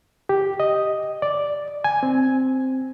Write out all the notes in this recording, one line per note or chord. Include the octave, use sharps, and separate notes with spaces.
G4
D#5
D5
G#5
C4